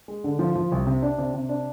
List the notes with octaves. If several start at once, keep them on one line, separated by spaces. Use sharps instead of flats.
G#3
D3
F3
F3
C2
C3
D4
C3
C3
D4